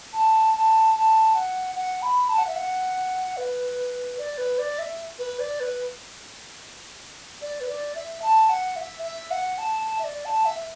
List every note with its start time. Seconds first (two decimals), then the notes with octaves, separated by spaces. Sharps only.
0.13 A5
0.54 A5
0.94 A5
1.34 F#5
1.75 F#5
2.02 B5
2.29 A5
2.38 F#5
2.47 E5
2.56 F#5
3.37 B4
4.18 D5
4.38 B4
4.58 D5
4.79 E5
5.19 B4
5.39 D5
5.60 B4
7.42 D5
7.60 B4
7.68 D5
7.95 E5
8.22 A5
8.49 F#5
8.76 E5
9.03 E5
9.31 F#5
9.58 A5
9.85 A5
9.99 E5
10.04 D5
10.25 A5
10.45 E5
10.59 E5